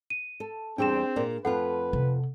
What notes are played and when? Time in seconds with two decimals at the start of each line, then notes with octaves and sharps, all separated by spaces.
0.10 D#7
0.40 A4
0.78 E2 G3 C4 D4 G#4 G5 E7
1.16 A#2 A#3 D5
1.45 F2 A3 F4 A4 B4 F#5
1.93 C3